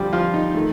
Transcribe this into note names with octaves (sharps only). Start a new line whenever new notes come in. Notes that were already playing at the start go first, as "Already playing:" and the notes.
Already playing: G2 D3 F3 G3 G4
F3 F4
D#4
D#3 A3